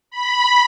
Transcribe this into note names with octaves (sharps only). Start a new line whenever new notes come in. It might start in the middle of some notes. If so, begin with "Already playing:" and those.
B5